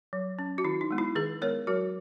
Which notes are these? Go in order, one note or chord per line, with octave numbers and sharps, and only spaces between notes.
F#3
C#4
F#4
D#3 E4
D#4
G#3 B3
E4
D#3 G#4 B4
G#3 B3 A#4 C#5
F#3 F#4 A#4